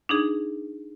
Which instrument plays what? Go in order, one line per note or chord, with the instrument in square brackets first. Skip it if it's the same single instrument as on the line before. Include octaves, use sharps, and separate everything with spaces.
[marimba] D4 D#4 G#4